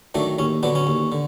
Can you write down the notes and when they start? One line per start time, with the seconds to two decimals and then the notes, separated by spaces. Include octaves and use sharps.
0.14 D#3 F#3 A3 D4
0.39 D#2 C#4
0.63 D3 F#3 B3 D4
0.75 C#4
0.87 D#2
1.12 D3